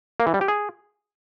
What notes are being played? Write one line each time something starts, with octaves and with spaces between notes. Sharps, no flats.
A#3
E3
G3
G4
G#4